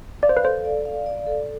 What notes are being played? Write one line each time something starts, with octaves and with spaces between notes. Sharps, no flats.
D5 F5
C5
B4
A4 C5
D5
F5
D5
A4